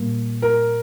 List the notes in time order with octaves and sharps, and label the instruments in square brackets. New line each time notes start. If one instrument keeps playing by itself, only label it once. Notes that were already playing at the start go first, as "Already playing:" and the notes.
Already playing: [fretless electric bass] A#2 G3 A#3
[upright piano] A#4